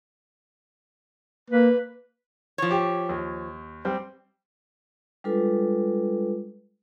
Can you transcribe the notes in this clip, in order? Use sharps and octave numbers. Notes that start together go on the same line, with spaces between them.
A#3 B4
F3 C#5
G4
D#2
G3 C4
G3 G#3 D4 F4 A4 B4